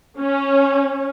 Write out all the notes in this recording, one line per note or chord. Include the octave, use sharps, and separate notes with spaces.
C#4